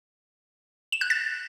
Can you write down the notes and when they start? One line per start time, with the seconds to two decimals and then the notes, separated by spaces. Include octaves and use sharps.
0.92 E7
1.01 F#6
1.10 A6